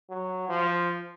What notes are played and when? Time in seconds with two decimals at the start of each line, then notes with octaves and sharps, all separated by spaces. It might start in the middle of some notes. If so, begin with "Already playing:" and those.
0.10 F#3
0.49 F3